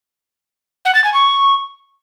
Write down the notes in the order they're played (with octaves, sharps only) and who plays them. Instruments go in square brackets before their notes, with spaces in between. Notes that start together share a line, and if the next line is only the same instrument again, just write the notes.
[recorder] F#5
A6
G#5
C#6